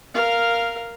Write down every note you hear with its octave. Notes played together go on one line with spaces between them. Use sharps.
A#4 F5